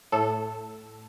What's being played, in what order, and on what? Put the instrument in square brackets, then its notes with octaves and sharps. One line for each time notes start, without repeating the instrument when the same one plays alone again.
[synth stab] A2 A4